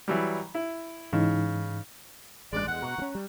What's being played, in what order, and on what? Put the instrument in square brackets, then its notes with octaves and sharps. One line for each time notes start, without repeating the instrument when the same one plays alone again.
[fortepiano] E3 F#3 G3
E4
[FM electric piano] G#2 E3 D#4 [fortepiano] C#3
[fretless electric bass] A1 G2 [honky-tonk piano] G#3 F#6 [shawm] D5
[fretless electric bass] E2 [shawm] F#5
[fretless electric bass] B2 [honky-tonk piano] A#5 C#6
[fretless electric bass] E3 C#4
G3